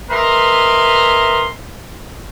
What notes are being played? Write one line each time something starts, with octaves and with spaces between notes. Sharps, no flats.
G#3 A#4 B4 E5 C6